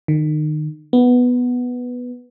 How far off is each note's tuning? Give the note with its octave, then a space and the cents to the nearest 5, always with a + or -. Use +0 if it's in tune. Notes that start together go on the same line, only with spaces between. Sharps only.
D#3 -30
B3 +0